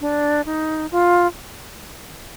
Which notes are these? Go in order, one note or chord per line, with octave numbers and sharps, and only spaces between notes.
D4
D#4
F4